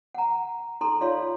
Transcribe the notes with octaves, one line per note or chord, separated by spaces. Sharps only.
F#5 A#5
D#4 A4 A#5 C6
D#4 F4 C#5 D5 F5 C6